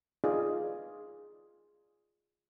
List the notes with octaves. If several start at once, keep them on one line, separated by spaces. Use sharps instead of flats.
D#4 F4 G#4 B4 D5 D#5